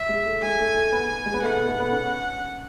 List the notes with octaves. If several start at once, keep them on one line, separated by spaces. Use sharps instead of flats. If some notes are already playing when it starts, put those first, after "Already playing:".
Already playing: E5
G#3
A3
G#3 G#5
A3
A3
B3
G#3
B3
A3 F#5
B3
A3
B3
C#4